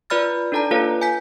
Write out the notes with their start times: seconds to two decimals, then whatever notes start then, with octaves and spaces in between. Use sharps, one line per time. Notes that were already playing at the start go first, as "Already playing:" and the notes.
0.10 F4 B4 D5 B5 F6 A6
0.52 D4 D#4 A4 D5 A5 A#5
0.71 A#3 F4 A4 B4 C#5 F5
1.02 G#5 G6 B6